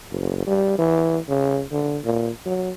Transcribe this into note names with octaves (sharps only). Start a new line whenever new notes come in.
F#1
G3
E3
C#3
D3
A#2
F#3